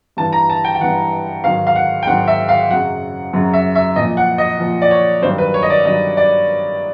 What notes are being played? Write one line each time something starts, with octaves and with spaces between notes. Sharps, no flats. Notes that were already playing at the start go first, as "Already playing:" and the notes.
G2 E3 A5
A#5
A5
G5
G5
G2 E3 F#5
G#2 D#3 F#3 F5
F5
F#5
G5
G#2 D#3 F#3 F#5
E5
F5
F#2 C#3 F#3 F#5
F#2 C#3 F#3
E5
E5
A#2 F3 D#5
F#5
D#5
A#2 F3
D5
C#5
G2 D#3 F#3 C5
B4
C#5
D#5
D5
G2 D#3 F#3 D#5
D5